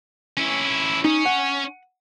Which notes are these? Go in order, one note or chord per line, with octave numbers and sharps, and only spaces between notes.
C#4 E4
C#4 D#4
F#5